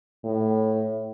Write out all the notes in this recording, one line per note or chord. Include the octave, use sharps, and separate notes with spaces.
A2